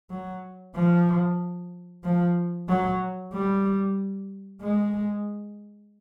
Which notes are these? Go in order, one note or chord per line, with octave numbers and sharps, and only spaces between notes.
F#3
F3
F3
F#3
G3
G#3